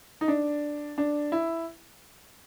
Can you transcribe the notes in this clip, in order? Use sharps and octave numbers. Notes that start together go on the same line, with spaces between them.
D#4
D4
D4
E4